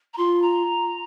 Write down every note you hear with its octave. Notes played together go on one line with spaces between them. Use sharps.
A#5
F4 C6
A#5